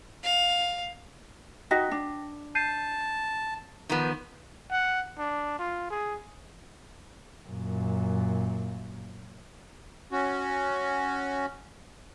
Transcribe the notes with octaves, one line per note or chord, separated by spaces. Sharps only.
F5
D#4 F#4 D#5 G5 A#6 B6
D4
A5 G6 C7 D#7
D#3 F3 B3
F#5
D4
F4
G#4
F#2 A#2
C#4 F#4